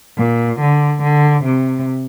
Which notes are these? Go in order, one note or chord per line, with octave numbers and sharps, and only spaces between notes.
A#2
D3
D3
C3